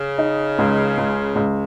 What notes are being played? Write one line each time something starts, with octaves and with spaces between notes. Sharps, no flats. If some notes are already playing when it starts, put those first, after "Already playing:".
Already playing: C#3
D#4
C#2
C#2
C#2